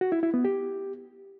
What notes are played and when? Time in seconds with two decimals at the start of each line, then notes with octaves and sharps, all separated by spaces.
0.01 F#4
0.12 E4
0.23 E4
0.34 B3
0.45 G4